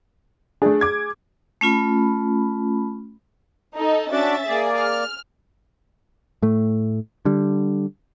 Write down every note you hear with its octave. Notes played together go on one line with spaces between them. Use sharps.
A3 D4 G#4
D6 G#6
A3 C#4 F4 B5
D#4 A4
C#4 D4 F#4 D5 E5 A6
A#3 G#4 D5
F6
A2 A3
D3 G3